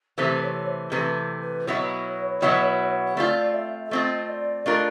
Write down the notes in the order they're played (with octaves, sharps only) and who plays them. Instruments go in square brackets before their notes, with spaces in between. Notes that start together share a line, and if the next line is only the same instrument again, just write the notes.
[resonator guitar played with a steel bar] C3 E3 A3 [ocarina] C5
[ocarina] C#5
C5
[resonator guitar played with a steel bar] C3 E3 A3 [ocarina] B4
[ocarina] B4
[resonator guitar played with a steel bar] B2 F#3 B3 E4 [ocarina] C#5
[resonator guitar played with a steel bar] B2 F#3 B3 E4
[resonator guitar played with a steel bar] A3 C4 F4 [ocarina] D5
[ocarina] E5
E5
[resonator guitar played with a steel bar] A3 C4 F4 [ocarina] D#5
[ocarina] D5
[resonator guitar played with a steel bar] A3 D4 F4 A#4 [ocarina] D#5